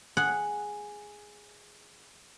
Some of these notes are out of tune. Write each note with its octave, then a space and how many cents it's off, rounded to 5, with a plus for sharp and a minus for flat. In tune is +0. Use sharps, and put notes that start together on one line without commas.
G#4 +0 F#5 +0